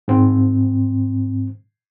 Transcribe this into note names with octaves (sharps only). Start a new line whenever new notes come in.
G#2 C4